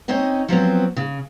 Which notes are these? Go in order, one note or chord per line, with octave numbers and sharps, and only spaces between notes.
C4 C#4 D#4 D#5
F3 F#3 B3 C4
C#3